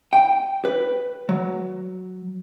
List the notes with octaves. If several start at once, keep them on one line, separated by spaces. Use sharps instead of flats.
G5
B4
F#3